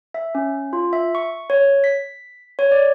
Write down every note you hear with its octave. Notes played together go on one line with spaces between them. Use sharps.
E5
C#4
F4
E5
C#6
C#5
B6
C#5
D5